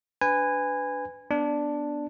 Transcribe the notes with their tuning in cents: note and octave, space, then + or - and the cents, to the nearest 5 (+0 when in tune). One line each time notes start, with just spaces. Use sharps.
D4 -15 B4 +20 G#5 -15
B3 +0 D4 +0